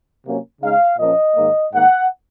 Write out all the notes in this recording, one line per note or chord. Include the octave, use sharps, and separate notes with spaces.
C3 F#3 A#3 C#4
C#3 G#3 D#4 F5
A#2 F3 A#3 C#4 D#5
G#2 D#3 A#3
G#2 D#3 A#3 F#5